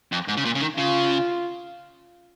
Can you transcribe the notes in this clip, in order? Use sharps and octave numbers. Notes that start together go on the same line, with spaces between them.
F2
G#2
C#3
A#2
C#3
D#3
C#3 F4